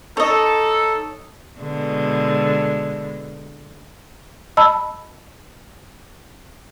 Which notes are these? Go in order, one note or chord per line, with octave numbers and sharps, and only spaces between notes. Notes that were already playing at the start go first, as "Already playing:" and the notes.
D#4 A4 C#5 D#5
B2 D3 G#3
D#5 A5 B5 E6